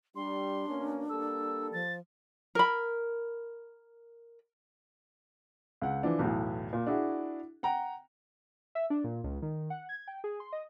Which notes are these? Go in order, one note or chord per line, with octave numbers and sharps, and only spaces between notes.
G3 D4 C6
B2 A#3 C#4
G3 A#3 A4 E6
F3 A6
A#4 B5
C#2 F#5
E3 F3 D4
B1 E2 A2
A#2
D4 E4 F#4 G#4
F#5 G5 A#5
E5
D4
A#2
C#2
D#3
F#5
G#6
G5
G#4
C6
D#5